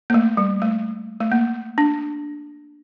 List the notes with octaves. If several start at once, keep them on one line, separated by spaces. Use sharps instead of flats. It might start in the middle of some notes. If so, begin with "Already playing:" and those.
A#3
A3
G3
A3
A3
A#3
D4